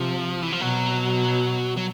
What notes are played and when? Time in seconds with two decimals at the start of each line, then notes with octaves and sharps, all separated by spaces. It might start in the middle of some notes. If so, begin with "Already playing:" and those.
Already playing: C3 F3
0.42 E3
0.52 F3
0.61 B2 F#3
1.77 F#3